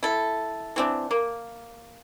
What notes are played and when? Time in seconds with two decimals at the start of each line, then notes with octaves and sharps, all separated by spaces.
0.03 E4 A4
0.76 E3 C4 D4
1.11 A#3